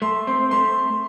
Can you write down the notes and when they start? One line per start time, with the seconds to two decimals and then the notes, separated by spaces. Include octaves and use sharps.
0.02 A3 C6
0.27 C4 C6
0.51 A3 C6